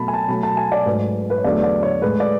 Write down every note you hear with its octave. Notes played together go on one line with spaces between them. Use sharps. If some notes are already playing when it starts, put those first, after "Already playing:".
Already playing: B2 F#3 A3 A5 B5
G#5
A5
B2 F#3 A3 B5
A5
G#5
D5
G#2 F#3 A3 B4
B4
C#5
E2 D3 F#3 A3 D5
D5
C#5
A2 G#3 B4
D5